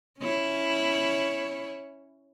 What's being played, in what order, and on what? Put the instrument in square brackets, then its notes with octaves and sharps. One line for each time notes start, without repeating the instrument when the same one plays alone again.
[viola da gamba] C#4 E4 C#5